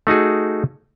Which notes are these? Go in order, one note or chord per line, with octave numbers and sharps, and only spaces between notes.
A3 D#4 F#4 G#4